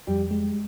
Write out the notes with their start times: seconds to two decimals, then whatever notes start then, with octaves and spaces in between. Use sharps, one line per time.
0.07 F2 G3
0.31 G#3